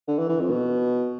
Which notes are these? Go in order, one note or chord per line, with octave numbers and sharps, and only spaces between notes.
D3
E3
E3
F2
B2